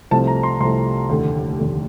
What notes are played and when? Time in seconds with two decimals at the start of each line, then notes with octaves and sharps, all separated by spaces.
0.11 C2 C3 F3 A3 A5
0.27 A#5
0.43 C6
0.60 C2 C3 F3 A3 C6
1.09 F1 D#2 D3 A3
1.58 F1 D#2 D3 A3